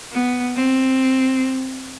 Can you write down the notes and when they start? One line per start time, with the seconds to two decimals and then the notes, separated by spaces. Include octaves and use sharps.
0.12 B3
0.56 C4